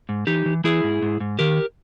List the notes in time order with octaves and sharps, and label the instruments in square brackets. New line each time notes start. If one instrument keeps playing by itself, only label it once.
[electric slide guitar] G#2
E3 D#4 G4
E3
E3 E4 G#4
G#2
G#2
G#2
D#3 G4 A#4